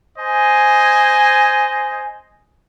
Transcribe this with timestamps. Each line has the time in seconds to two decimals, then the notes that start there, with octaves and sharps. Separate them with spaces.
0.18 C5 D#5 G#5